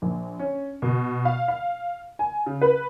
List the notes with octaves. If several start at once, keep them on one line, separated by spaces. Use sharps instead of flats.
A#1
C#4
B2
F5
F5
G#5
C#3
B4